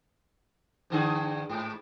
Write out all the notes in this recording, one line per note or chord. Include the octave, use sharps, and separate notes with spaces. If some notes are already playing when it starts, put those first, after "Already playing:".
G2 D3 G#4
G#2